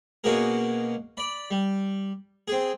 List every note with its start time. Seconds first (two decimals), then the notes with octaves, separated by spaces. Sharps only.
0.24 B2 A#3 C#4 F#4 G#4 A#4
1.17 D5 B5
1.51 G3
2.48 C4 G#4